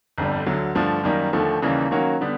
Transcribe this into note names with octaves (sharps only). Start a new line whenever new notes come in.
G1 F2 D3 G3
D2 D3 F#3
G2 D3 F3 A3 D4
F#2 D#3 G3 A#3
D#2 D3 F3 A3
D#2 C#3 E3 G3 A#3
D#3 F#3 A#3 C#4 F#4
D3 G3 B3